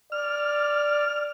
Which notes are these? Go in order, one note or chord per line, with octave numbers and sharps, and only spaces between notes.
D5 F6